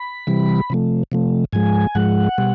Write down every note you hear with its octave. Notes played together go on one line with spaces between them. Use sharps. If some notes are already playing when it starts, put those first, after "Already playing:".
Already playing: B5
C3 E3 G3
C3 F3 A3
C3 F3 A3
G#2 F3 G#3 G#5
G#2 F3 G#3 F#5
B2 G3